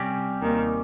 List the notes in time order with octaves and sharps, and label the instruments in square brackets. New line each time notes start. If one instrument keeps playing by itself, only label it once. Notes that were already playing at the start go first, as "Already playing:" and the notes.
Already playing: [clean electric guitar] C2 C3 G3 C#4 G4
[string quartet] D#2 D#3